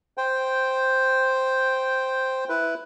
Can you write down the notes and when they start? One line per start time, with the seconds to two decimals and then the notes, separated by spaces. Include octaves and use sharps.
0.18 C5 G5
2.49 E4 B4